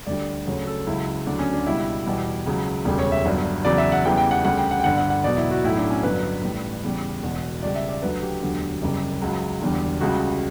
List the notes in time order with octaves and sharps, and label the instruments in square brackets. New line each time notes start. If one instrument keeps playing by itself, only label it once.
[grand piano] D2 D3 G3 D5
D2 C#3 F#3 C#5
A4
C#2 C#3 F#3 E4
D2 D3 F#3 D4
C#4
D4
C#2 B2 G3 E4
E2 B2 G3
C#2 C#3 F#3
E1 D2 C#3 G3
C#5
E5
G1 G2 F#3
E2 C#3 F#3 D5
E5
F#5
E2 C#3 E3 G3 G5
G5
F#5
D2 C#3 G3 F#5
G5
F#5
G5
G1 G2 D3 F#5
F#5
F#5
E1 E2 B2 F#3 D5
E4
F#4
B1 A2 F#3 E4
D4
C#4
G1 G2 F#3 B4
A1 A2 G3
E2 C#3 G3
E1 E2 B2
C#2 C#3 G3 D5
E5
D5
D2 D3 F#3 B4
G4
E1 D2 D3 F#3
F#1 F#2 C#3 G3
C#2 C#3 F#3
E1 E2 D3 G3
C#2 C#3 G3 F#4